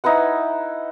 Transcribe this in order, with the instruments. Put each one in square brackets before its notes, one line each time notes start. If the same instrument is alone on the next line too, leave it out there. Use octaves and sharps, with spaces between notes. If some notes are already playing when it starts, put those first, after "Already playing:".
[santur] D#4 E4 B4 F#5